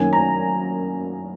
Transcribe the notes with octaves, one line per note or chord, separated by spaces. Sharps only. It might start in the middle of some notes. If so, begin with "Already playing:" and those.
Already playing: F#2 D#3 A#3 C#4 G#5
A#5